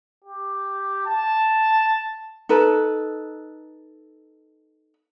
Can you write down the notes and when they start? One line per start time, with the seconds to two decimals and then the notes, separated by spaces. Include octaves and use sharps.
0.24 G4
1.06 A5
2.49 D#4 A4 B4